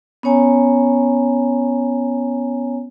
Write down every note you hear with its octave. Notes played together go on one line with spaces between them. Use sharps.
B3 C#4 C#5 G#5 A#5